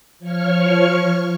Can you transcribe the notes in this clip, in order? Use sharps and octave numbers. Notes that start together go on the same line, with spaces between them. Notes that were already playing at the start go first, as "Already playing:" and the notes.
F3 C#5 C#6 F6